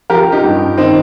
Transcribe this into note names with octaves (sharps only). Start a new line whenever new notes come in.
F3 G4 A#4
D#4 G4
G2
D#3 C4 D#4